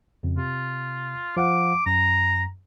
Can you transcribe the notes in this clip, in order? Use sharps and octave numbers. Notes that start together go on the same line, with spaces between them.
F2 C#3
C3 F4
F3 F5 F#5 D6
F#2 A#5